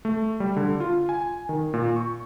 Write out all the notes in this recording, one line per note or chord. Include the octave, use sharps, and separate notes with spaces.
A3
G3
D3
F4
G#5
D#3
A#2
C#6